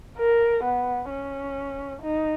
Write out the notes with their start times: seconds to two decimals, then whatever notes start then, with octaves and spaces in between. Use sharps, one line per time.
0.18 A#4
0.64 B3
1.10 C#4
2.02 D#4